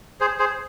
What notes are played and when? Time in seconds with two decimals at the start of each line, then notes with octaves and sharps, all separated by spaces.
0.21 G#4 C5
0.39 G#4 C5